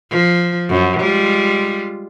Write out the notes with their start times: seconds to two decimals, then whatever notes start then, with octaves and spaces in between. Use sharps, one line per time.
0.11 F3
0.69 F#2
1.00 G3 G#3 F4